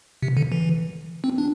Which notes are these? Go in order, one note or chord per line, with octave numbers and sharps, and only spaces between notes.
C3
D3
E3
C4
D4